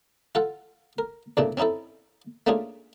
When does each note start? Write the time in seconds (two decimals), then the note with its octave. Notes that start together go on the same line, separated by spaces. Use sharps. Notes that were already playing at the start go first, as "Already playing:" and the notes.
0.35 F4 A4 F#5
0.98 A#4
1.37 E2 A#2 C#3 A3 D4
1.57 C4 C#4 D#4 E4 A4
2.47 A3 A#3 C#4 D4 F4 G#4